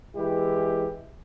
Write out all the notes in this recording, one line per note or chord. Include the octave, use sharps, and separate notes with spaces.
E3 G#3 E4 G4